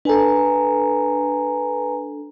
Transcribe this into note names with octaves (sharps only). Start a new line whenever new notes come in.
D4 A4 B4 G#5 A#5